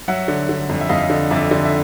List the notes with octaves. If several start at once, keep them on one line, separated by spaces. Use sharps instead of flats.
F#3 E5 F#5
D3
D3
F2
E5
F2 D#5 F5
D3
F2 D5 E5
D3
E5